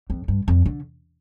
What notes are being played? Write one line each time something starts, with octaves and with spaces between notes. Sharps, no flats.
F2
G2
F2
D3